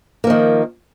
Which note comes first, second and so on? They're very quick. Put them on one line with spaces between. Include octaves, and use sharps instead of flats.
A#3 F3 D#3